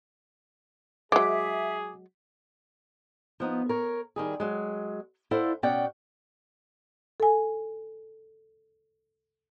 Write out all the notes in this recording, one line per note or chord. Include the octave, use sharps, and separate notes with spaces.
F#3 G#3 G#4 E5 D6
F3 B3 D#4
A#4 C#5
D#3 G3 G#4
F#3 G#3
E4 A4 C5 D5 F5 F#5
B2 C#4 D5 F#5 G5
A4 G#5